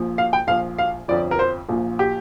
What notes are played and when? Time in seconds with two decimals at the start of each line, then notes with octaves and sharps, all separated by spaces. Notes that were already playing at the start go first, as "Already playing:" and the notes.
Already playing: A#1 A#2 F3
0.18 F5
0.33 G5
0.47 A#1 A#2 F3 F5
0.78 F5
1.08 G1 F2 F3 D5
1.31 A#4
1.39 C5
1.69 A#1 A#2 F3
1.99 G4